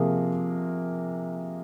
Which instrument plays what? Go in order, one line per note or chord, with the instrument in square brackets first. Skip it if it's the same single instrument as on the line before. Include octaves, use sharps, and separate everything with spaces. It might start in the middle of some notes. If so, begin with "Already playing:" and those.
Already playing: [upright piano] C3 F3 A#3 G#4